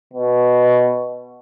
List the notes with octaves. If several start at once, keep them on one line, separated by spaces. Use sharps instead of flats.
B2